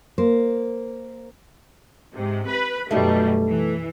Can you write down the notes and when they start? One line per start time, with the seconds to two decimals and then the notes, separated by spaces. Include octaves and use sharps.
0.18 A#3 C5
2.15 G#2 C3
2.47 B4 B5
2.91 F#2 B2 G3 A3 D#4
3.50 E3